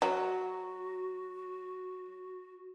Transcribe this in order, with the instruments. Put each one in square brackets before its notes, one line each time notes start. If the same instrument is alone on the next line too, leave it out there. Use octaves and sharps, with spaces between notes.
[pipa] F#3 [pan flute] F#4